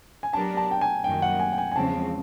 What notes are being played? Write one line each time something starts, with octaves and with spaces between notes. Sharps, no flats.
G#5
F#3 B3 D4 G4 A#4 A5
A5
G5
G#5
F#2 D#3 G3 A#3 G5
F#5
G#5
G5
G#5
G#5
E2 C#3 F3 G#3 C4 A5